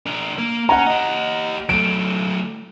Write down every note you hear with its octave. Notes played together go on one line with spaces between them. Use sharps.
D4 A#4
A#3
C#4 F#5 A#5
G4 D#5
F#3 A3 D7